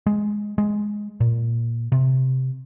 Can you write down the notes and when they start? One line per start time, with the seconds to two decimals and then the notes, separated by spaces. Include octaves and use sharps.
0.06 G#3
0.58 G#3
1.20 A#2
1.92 C3